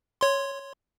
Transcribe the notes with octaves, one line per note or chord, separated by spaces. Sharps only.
C#5 C6